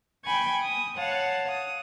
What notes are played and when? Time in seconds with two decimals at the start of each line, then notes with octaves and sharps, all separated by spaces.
0.24 G5 G#5 B5 C#6 G#6
0.61 D#6
0.96 C#5 F5 F#5 A5
1.50 D#6